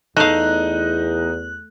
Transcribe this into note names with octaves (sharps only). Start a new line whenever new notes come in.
E2 A3 D#4 D#5 F5 F#6